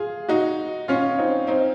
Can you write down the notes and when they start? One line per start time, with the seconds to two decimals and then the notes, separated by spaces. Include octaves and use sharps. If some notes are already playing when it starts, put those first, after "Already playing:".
Already playing: F4 G#4
0.29 D#4 F#4
0.88 C#4 F4
1.18 C4 D#4
1.47 C4 D#4